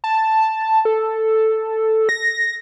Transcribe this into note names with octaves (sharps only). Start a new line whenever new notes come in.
A5
A4
A#6